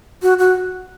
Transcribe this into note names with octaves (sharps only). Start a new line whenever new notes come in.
F#4
F#4